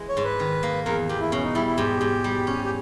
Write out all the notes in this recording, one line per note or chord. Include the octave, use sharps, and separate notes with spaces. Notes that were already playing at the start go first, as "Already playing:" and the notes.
Already playing: E3 G#3
C#5
G#2
B4
D#3
A#3
E2 A#4
E2 G4
E4
B2 C#4
D#4
G3 E4
E4
G#2 G4
G#2
G3
C#4
G4